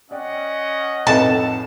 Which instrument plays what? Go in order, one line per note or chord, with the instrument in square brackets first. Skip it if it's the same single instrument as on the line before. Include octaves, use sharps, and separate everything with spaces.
[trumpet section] C#4 D#5 F#5 [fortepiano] D5 G5
[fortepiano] F2 A2 [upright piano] D#4 A4 B4 [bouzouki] A5